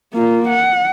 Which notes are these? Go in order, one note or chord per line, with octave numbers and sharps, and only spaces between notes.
A#3 F4
F#5